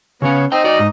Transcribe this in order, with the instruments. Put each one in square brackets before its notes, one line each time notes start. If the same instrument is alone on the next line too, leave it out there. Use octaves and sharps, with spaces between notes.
[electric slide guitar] C#3 C#4 [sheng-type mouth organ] B3 C#5
[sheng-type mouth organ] D#4 D#5 [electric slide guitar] C5 G5
[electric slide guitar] F#4 D5
G#2